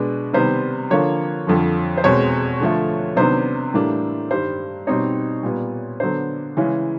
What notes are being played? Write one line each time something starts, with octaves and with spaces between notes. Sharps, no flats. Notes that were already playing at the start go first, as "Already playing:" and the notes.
Already playing: B2 G#3 B3 D4
C3 D#3 G3 B3 C5
D3 F3 A#3 C#5
F2 D3 F3
C5
E2 B2 G#3 C4 C#5
D3 F3 A3
C3 D#3 F#3 B3 D4 C5
A2 E3 G3 A#3 D4
G2 D#3 G3 C5
B2 G3 C4 D#4 C#5
A#2 G3 B3
D3 F#3 B3 D4 C5
C#3 E3 G#3 C#4